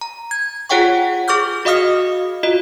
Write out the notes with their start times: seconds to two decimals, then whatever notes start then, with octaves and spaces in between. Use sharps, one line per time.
0.01 A#5
0.31 G#6
0.69 F4 G#4 C#5 F#5 G5 C#6
1.28 G#4 C#6 D6 F6 G6
1.65 F#4 D#5 F5 D#6 F6 C#7
2.43 F4 F#4 D#5